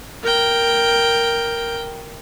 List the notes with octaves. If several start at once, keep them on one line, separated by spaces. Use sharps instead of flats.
A#4 G5